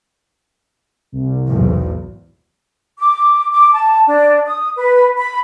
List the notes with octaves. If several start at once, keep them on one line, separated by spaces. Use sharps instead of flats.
C2
B1 E2 G#2
D6
D6
A5
D4
D#6
B4
B5